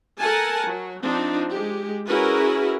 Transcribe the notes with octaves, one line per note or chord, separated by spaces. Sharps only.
A4 A#4 F#5 G#5 A5
F#3
F3 C4 D4 D#4
G#3 G4
C#4 E4 F#4 G#4 A#4 B4